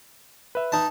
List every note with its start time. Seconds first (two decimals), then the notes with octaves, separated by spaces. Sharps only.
0.55 B4 E5
0.72 D#4 A5